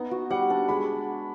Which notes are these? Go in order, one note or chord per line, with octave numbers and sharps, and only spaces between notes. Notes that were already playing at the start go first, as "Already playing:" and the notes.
Already playing: B3 D#4
F#4
G3 F#5
D4
G#3 B5